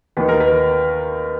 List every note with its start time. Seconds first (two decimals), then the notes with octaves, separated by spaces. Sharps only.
0.17 D#2 D#3 B4
0.29 A#4
0.40 B4